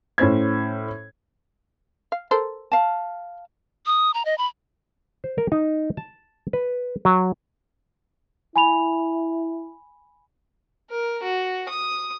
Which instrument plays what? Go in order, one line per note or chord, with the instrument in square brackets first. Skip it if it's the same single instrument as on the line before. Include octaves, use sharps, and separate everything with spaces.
[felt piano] A2 C#4 C5 G#6
[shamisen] F5
A4 A#4 C5
[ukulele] F5 A5
[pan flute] D#6
A#5
D#5
B5
[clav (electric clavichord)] C5
A#4
D#4
A5
B4
F#3
[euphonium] E4 [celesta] G#5 B5 F7
[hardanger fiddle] A#4
F#4
D#6